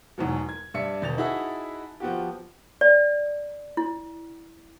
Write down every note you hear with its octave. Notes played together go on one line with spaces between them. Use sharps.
E2 G#2 B2 F#3
G#6
G2 D5 E5 C#7
E1 A6 F7
D#4 E4 F#4 G#4 E5 A5
F3 B3 F#4 G4
D5
E4